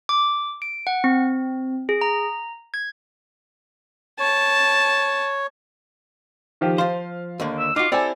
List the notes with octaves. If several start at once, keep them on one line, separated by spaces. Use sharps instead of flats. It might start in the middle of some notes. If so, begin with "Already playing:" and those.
D6
D7
F#5
C4
G#4
A#5
G#6
C#5 A5
D#3 F3 G4
F3 C5 F5
D#2 D3 A#3
E6
D#4 F4 F#4 D6
C4 E4 G4 A4 D5 G#5